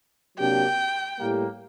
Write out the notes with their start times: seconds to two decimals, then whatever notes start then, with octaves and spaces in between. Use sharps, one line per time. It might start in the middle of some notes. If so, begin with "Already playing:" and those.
0.38 C3 F#3 A#3 D4 G4 G5
1.19 A2 G3 A#3